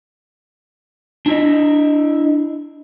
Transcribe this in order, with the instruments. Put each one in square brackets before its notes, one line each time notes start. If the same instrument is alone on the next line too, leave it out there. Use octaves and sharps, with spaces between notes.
[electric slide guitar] D4 E4 D#5